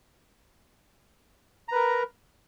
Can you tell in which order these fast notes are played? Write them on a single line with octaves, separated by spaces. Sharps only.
A#5 B4 A#4